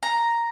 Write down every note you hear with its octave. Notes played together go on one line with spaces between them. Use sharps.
A#5